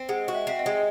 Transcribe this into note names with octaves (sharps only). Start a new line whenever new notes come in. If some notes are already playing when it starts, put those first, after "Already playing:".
Already playing: C4
G#3 F#5
F#4
E5
C4 E5
D#5
G#3